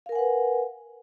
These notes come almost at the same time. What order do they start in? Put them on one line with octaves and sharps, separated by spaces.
F5 A#4 G#5 F#5 B4